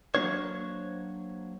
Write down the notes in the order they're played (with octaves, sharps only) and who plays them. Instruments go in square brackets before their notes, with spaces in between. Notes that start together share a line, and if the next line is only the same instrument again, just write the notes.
[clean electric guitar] F#3 A#3 D4 C5 C#5